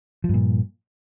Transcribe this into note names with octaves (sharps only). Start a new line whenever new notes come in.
G2 A#2 F3